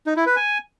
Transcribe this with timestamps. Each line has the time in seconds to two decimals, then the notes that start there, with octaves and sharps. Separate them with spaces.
0.07 D#4
0.16 E4
0.26 B4
0.36 G#5